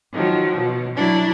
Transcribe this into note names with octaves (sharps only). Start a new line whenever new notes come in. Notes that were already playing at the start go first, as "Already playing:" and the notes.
D#3 F3 F#3
B2
F#3 D4 E4